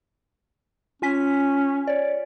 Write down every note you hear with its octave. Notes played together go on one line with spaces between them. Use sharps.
C#4 F4 G#5 B6
C#5 D5